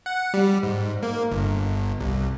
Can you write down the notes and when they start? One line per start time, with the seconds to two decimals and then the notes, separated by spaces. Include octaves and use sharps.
0.06 F#5
0.34 G3
0.63 G#2
1.03 A#3
1.31 G1
2.00 C2